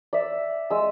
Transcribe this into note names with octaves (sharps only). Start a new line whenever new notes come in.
D5 E5
G#3 E6